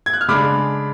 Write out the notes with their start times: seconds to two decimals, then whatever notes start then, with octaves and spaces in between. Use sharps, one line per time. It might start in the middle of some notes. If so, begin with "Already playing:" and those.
0.06 G#6
0.14 F#6
0.21 F6
0.28 C#3 G#3 D4 B5 D6